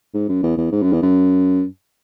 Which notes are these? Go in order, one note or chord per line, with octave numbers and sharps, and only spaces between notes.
G#2
F#2
E2
E2
G#2
F#2
E2
F#2